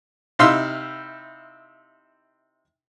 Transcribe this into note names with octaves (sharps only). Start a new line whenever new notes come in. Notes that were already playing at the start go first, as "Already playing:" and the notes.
C3 D#4 E4 F5 C6 E6